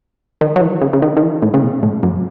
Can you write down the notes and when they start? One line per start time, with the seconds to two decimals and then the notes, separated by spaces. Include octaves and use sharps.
0.41 D#3
0.56 F#3
0.61 E3
0.81 C#3
0.93 C#3
1.02 D#3
1.17 D#3
1.22 E3
1.42 A2
1.54 C#3
1.62 B2
1.83 A2
2.03 F#2